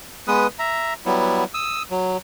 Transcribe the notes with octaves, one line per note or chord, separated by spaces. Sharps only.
G#3 B3 B4 D#6
E5 A#5
F#3 G3 B3 E4
D#6 E6
F#3